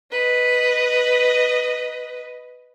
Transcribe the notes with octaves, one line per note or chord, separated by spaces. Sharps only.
B4 D#5